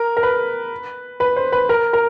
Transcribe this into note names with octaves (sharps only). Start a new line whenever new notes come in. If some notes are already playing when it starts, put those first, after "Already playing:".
Already playing: A#4
A#4
B4
B4
C5
B4
A#4
A#4